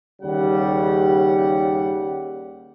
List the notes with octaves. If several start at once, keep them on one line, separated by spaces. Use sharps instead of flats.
D#2 C#3 G3 F#5